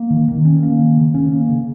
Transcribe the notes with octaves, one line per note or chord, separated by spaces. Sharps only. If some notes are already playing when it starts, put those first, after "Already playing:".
Already playing: A#3
D#3
D#3
C#4
A#3
D#3
C#3
C#4
A#3
C#3